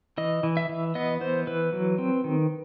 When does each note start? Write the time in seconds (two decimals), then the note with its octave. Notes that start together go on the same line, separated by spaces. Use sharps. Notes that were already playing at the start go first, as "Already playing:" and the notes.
0.18 E3 D#5
0.43 E3
0.57 E5
0.69 E3
0.95 B3 D#5
1.21 E3 C5
1.47 E3 B4
1.73 F#3
1.98 C4
2.24 D#3